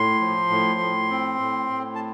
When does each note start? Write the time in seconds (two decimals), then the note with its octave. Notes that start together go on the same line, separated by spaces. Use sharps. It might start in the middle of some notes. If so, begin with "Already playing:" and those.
Already playing: A2 C6
0.21 F3
0.50 A2
0.80 A2
1.11 C4
1.39 A2
1.70 A2
1.95 A5